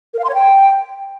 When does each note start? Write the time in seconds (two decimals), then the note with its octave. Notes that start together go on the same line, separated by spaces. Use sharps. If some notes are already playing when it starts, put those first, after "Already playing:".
0.13 A#4
0.19 F5
0.24 C6
0.29 C#5
0.34 G5